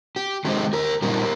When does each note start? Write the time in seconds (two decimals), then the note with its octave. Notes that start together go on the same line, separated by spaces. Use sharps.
0.16 G4
0.45 D#3 G#3 C4 D#4 G4
0.73 G4 A#4
1.02 A#2 G3 C4 D#4 G4 A#4